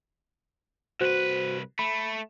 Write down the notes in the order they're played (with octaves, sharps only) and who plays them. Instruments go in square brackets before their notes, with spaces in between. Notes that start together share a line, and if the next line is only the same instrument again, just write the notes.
[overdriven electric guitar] C2 B4 [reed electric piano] F#4 C5 F#6
[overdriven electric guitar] A3 [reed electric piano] B5